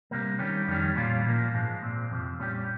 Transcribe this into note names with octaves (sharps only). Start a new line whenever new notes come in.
C3 G3 A#3
D#3 G3 C#4 G4
F2 D#3 G3 C#4
A#2 G3 C#4 F4
A#2 F3 A#3
G#2 F3 G#3
A#2 G#3 C4
F2 C3 F3
A#2 G3 C#4 G4